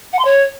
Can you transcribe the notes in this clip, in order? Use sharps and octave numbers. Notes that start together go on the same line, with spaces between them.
F#5
C6
C#5